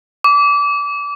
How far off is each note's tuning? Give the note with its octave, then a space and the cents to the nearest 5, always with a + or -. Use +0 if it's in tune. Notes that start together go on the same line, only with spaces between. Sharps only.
D6 -25